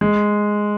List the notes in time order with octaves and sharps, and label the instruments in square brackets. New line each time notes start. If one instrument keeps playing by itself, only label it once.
[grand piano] G#3